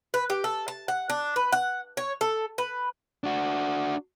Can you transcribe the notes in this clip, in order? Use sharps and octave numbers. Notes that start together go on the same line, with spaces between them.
B4
G4
A4
A5
F#5
D4
B4
F#5
C#5
A4
B4
D4 F#4